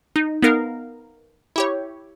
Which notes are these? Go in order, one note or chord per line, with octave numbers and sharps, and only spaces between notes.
D#4
B3 D#4 A#4 F5
E4 G4 C#5